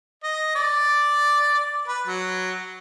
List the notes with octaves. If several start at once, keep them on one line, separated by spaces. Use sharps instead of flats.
D#5
D5
B4
F#3